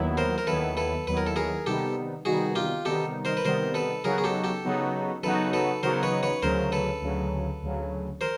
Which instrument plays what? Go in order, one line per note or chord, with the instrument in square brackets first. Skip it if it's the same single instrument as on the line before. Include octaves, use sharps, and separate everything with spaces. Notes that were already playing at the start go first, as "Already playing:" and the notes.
Already playing: [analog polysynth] D#2 D#3 F#3 B3 E4
[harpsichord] A#4 C5
A#4
[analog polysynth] D#2 D#3 F#3 B3 E4 [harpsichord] A4 B4
[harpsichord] A4 B4
[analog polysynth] D#2 D#3 F#3 B3 E4 [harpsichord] B4
[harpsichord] A#4
A4
G#4 A#4
[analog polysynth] C3 D#3 G3 B3 D#4 [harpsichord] G4 A4
[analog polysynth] C3 D#3 G3 B3 D#4 [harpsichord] F#4 G#4
[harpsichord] F4 G4
[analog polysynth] C3 D#3 G3 B3 D#4 [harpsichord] G4 A4
[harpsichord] A#4 C5
B4
[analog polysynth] C3 D#3 G3 B3 D#4 [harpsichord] A#4 C5
[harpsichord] A4 B4
[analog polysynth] C#3 F#3 B3 D#4 F#4 [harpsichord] G#4 A#4
[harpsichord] G#4
G4 A4
G4 A4
[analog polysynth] C#3 F#3 B3 D#4 F#4
[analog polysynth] C#3 F#3 B3 D#4 F#4 [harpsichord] A4 B4
[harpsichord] A4 B4
[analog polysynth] C#3 F#3 B3 D#4 F#4 [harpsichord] A#4 C5
[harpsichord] B4 C#5
B4 C#5
[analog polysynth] D2 C#3 F#3 [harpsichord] A#4 C5
[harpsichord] A4 B4
[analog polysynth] D2 C#3 F#3
D2 C#3 F#3
[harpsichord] A#4 C5